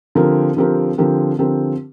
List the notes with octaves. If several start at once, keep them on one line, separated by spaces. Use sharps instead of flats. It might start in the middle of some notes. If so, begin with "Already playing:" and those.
D3 F3 C4 G4 A#4
D3 F3 C4 G4 A#4
D3 F3 C4 G4 A#4
D3 F3 C4 G4 A#4